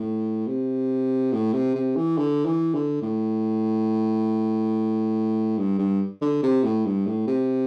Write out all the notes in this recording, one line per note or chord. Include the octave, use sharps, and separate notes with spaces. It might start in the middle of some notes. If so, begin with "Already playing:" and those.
Already playing: A2
C3
A2
C3
C3
E3
D3
E3
D3
A2
G2
G2
D3
C3
A2
G2
A2
C3